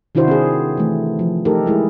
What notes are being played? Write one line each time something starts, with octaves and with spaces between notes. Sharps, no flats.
C3 D#3 D4 E4 F#4 C5
C4 G#4
E3 A3
F3
A3 D#4 G4 A4 A#4
G#3 E4 G#4